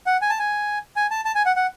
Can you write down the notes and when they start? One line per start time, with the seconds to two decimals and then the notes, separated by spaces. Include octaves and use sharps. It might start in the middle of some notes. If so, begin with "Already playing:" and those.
0.06 F#5
0.22 G#5
0.30 A5
0.39 G#5
0.96 G#5
1.11 A5
1.25 A5
1.35 G#5
1.46 F#5
1.56 F#5